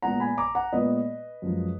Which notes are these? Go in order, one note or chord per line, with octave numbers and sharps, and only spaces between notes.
A#2 G#3 B3 F#5 A#5
G#5 B5
A#5 D6
F#5 A#5
A#2 G#3 B3 B4 D#5
F#2 F3 G#3